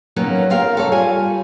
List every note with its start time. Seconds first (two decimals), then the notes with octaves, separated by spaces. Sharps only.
0.16 D#3 F#3 A#3 B3 C#4
0.50 F4 G4 A#4 F5
0.77 A4 C#5
0.92 G3 F4 G#5